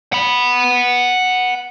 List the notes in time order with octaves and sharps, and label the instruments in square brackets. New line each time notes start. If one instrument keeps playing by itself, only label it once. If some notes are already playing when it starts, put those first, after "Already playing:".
[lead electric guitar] F#5 B5